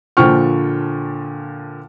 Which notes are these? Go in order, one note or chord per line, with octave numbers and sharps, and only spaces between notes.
A#2 D3 F3 G5 C#6 F6